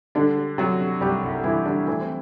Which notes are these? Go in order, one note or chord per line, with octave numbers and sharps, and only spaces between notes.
D3 G3 D4
G3
C3 F#3 F#4
C3
C2 G3 G4
C2
C2 E3 E4
D3 G3 D4
E3 A3 E4
C4